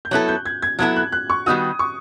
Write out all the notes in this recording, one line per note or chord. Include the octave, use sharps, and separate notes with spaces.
G6
F#3 B3 E4 A4 F#6
G6
G#6
G#6
F#3 B3 E4 A4 G#6
F#6
F#6
C#6
D#3 G3 B3 D#4 F#4 D#6
C#6